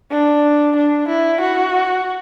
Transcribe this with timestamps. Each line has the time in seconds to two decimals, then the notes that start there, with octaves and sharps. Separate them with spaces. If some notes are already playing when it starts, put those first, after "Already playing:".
0.11 D4
0.76 D4
1.08 E4
1.40 F#4